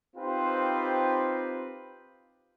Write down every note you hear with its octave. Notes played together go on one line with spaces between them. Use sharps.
C4 D#4 F4 G4 B4 C5